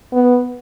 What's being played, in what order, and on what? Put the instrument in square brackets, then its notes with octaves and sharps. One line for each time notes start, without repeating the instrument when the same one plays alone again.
[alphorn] B3